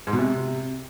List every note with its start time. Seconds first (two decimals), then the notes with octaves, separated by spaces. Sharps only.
0.07 G#2
0.13 B2
0.19 C3